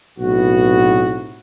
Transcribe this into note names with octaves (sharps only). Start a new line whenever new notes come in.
B1 A2 C3 B3 F#4